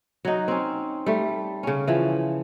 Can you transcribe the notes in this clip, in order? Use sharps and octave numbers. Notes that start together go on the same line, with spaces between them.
F#3 D#4
C4 C#4
G3 A3
C#3 C#4
E3 F3